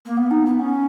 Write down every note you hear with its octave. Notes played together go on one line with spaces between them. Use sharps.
A#3
B3
D#4
B3
C#4